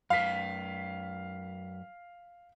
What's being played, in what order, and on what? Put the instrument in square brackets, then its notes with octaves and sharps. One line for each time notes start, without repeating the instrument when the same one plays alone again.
[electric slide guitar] F#2 B4 [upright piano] F5 B6